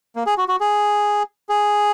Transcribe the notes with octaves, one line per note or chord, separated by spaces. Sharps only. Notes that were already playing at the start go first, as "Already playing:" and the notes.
A#3
G#4
F#4
F#4
G#4
G#4